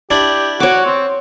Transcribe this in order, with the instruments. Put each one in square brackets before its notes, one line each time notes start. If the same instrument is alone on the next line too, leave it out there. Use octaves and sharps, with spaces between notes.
[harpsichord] D4 E4 [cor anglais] G4
[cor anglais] F#4 [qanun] C#5 D6
[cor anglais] C4